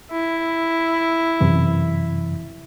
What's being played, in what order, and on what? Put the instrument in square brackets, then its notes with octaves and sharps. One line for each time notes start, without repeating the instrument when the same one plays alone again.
[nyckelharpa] E4
[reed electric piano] F#2 C3 E3